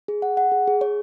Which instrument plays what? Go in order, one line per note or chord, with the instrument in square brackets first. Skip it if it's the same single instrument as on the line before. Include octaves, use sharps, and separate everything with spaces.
[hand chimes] G#4
F#5
F#5
G#4
G#4
C#5